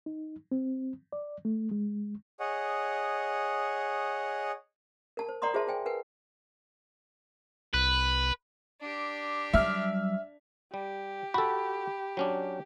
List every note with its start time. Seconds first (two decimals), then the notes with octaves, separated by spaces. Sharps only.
0.06 D#4
0.52 C4
1.13 D5
1.45 A3
1.71 G#3
2.40 G#4 C#5 D#5 F#5
5.17 A#4 A5
5.29 C5
5.42 A#4 D5 F#5 A#5 C6 D#6
5.54 F4 G#4 C5 E5 A5 C6
5.67 G#4 C5 G5 G#5
5.86 A#4 B4 F#5 G#5
7.74 C2 B4
8.81 D4 G4
9.53 F#3 G3 E5 F6
10.74 G3 G4
11.34 F#4 A4 B5
12.17 F#3 C#4 D4